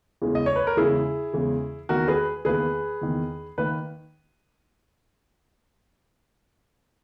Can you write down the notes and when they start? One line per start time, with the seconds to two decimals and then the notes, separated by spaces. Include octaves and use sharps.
0.22 E2 C#3 E3 G#3
0.35 D#5
0.46 C#5
0.56 B4
0.67 A#4
0.77 E2 C#3 E3 G#3 E4 G#4
1.33 E2 C#3 E3 G#3
1.89 E2 D#3 A#3 F#4 A#4
2.08 G#4 B4
2.45 E2 D#3 A#3 G#4 B4
3.01 E2 D#3 A#3
3.58 D#3 A#3 B4